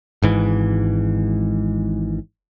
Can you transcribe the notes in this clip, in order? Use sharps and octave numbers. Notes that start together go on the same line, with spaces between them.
G#1 G#2 E3